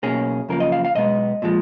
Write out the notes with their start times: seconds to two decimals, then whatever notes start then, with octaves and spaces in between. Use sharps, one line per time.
0.03 B1 B2 A#3 C#4 G#4
0.49 F#2 C#3 F3 A#3 A#4
0.60 D#5
0.72 F5
0.85 F5
0.95 B1 B2 G#3 B3 D#5
1.42 A#2 F3 G#3